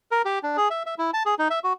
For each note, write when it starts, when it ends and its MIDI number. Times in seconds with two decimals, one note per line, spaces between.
0.11 0.22 70
0.25 0.39 67
0.43 0.57 62
0.57 0.68 68
0.70 0.83 76
0.86 0.95 76
0.98 1.11 64
1.14 1.23 81
1.26 1.35 68
1.39 1.48 63
1.50 1.59 76
1.64 1.73 66